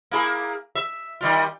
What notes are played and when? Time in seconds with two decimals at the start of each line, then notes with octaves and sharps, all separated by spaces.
0.11 A#3 E4 G#4
0.75 E5
1.21 D#3 G3 F4